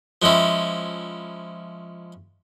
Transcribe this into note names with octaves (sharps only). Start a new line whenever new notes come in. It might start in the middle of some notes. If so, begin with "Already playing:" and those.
F3 G#3 C#4 E4